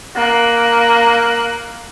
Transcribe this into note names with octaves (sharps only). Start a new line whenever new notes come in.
A#3 F#6